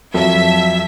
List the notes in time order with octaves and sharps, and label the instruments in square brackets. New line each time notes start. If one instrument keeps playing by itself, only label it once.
[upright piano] F2 F#3 [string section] E5 B6